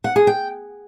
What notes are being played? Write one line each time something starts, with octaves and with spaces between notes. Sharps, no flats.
F#5
G#4
G5